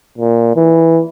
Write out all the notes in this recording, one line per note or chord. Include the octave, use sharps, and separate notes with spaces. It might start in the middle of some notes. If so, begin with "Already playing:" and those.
A#2
E3